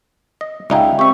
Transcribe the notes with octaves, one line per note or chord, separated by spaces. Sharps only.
D#5
C#2 D#4 G#4 D5 E5 F5 G5
C4 G4 E5 C#6